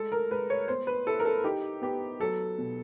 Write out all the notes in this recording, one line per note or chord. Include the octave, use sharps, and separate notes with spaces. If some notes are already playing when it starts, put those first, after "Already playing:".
Already playing: G#3 A4
A#4
G#3 B4
C#5
B3 C5
B4
E4 A4
A#4
A4
D#4 G4
B3 G4
F#3 A4
B2